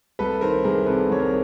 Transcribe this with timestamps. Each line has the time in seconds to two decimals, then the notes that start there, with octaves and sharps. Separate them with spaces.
0.19 C2 A4 B4
0.41 D#3 A#4 C5
0.64 C2 G#4 A#4
0.86 C3 A4 B4
1.09 C2 C#5
1.19 A#4 C5